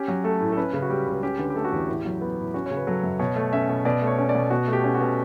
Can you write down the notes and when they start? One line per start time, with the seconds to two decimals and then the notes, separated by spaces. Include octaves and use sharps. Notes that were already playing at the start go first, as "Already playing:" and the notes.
Already playing: C#4 G4
0.08 F#3
0.24 A3 A4
0.41 A2
0.52 A4
0.57 C#4 B4
0.73 C#3
0.82 F#4
0.90 G3 G4
1.07 C#2
1.23 C#4 G4
1.39 D3 B4
1.50 G4
1.56 A3 A4
1.65 F#4
1.72 E2 G4
1.88 A2
2.05 F#3
2.21 B3
2.37 A2
2.54 C#4 F#4
2.66 C#3 C#5
2.77 B4
2.87 F#3 A4
3.03 F#2
3.20 B2 C#5
3.36 A3
3.52 C#4 E5
3.69 B2
3.85 B2 D5
4.02 A3
4.07 C#5
4.18 C#4
4.29 D5
4.35 B2
4.50 B2 F#4
4.67 A3
4.73 G4
4.84 C#4
4.95 F#4
5.00 B2